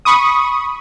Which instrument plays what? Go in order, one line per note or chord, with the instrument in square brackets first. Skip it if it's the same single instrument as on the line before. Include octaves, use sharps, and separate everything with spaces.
[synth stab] B5 C#6 D#6